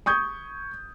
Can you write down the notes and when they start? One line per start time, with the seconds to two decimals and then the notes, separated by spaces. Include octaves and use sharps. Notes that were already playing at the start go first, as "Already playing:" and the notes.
0.06 C#6 D#6 G6 G#6